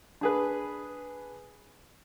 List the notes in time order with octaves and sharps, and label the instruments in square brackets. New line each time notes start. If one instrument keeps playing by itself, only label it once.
[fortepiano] D4 G#4 B4